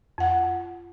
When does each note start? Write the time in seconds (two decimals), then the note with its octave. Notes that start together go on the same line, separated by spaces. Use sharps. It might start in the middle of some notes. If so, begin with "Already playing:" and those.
0.18 F2 F#5